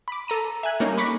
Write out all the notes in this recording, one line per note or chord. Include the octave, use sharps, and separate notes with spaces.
B5 D6
A4 A#5 D#7
E5 G#5 F#6
G3 A3 A#3 C#4 D#4
B5 C#6 D6 F#6 A#6 B6